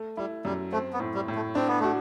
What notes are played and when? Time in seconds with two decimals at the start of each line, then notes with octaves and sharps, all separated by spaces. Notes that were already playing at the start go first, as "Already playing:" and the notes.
Already playing: A3
0.17 G3 E4
0.45 F#2 G3
0.72 A3 C4
0.93 B3
1.00 A2
1.14 G3
1.28 A2
1.35 A3
1.55 C4 D4
1.67 B3
1.80 A3 F#4